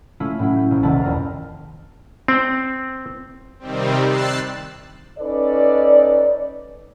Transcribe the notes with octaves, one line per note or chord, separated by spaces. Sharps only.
A3 C#4 E4 F4
A2 F#3 E4
G6
A#1
D#1 C2 E4 A#4 A5
F2 A#4 F5
C4
C3 D#3 G3 C4
E6 F#6 A6 C7
C#4 D#4 A4 B4 D5